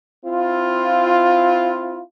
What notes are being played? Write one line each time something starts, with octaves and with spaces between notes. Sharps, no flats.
C4 E4 F4